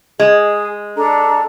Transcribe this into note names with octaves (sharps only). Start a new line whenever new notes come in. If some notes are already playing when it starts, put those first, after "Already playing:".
G#3 G#4
D4 A4 A#5